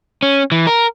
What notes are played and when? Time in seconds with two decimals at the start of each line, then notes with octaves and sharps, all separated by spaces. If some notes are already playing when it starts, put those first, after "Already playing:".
0.23 C#4
0.52 E3
0.67 A#4